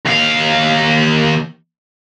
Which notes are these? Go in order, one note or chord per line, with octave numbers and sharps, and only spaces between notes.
D#2 F5